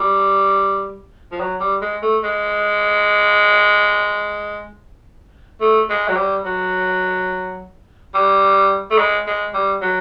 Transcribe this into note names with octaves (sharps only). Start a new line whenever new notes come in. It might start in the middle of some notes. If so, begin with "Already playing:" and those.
Already playing: G3
F3
F#3
G3
G#3
A3
G#3
A3
G#3
F#3
G3
F#3
G3
A3
G#3
G#3
G3
F#3